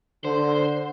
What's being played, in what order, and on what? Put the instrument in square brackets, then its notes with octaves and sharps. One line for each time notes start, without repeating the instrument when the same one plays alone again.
[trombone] D3 [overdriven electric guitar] C5